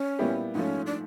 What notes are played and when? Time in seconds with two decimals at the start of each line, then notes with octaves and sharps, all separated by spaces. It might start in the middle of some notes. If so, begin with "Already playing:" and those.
Already playing: C#4
0.19 A#2 G3 B3 E4 G4
0.55 G#2 F3 A3 C#4
0.86 D4